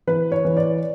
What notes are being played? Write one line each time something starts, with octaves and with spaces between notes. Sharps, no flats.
E3 B4
C#5
E3
D5